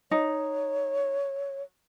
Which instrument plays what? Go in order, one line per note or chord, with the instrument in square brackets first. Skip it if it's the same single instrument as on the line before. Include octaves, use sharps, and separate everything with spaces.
[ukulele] D#4 [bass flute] C#5